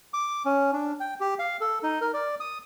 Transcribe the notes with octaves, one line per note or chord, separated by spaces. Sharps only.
D6
C#4
D4
G5
G4
F5
A4
D#4
A#4
D5
D#6